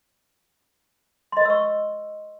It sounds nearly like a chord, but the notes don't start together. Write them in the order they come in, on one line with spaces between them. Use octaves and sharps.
C6 D#5 B4 E6 C#6